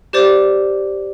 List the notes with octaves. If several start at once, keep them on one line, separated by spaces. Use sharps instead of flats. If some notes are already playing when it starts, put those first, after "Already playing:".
G4 C5 D5 D6 A6